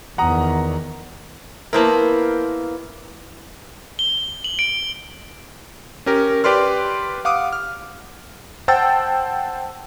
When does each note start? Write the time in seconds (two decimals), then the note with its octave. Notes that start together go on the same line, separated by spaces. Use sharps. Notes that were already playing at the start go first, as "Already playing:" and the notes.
0.18 E2 D#3 F#5 A#5 D#6
1.73 A#3 B3 E4 A#4 C5 A5
3.99 G7
4.44 F#7
4.59 D7
6.06 C#4 G4 A#4
6.44 G4 B4 D5 C6 F6
7.25 F5 F#5 D6 D#6
7.53 F6
8.68 C5 F#5 G5 A5 E6 A6